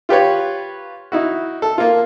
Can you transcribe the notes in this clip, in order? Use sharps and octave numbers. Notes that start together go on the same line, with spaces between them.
F4 G4 B4 C#5
D#4 E4 F#4
A4
A#3 F4